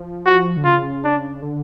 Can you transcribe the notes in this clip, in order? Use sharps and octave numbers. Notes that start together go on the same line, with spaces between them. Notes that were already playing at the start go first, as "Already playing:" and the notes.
Already playing: F3
F#4
D3
C#3 F4
D4
D3